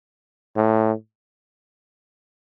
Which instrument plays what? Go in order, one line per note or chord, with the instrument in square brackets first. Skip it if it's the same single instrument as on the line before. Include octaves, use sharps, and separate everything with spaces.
[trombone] A2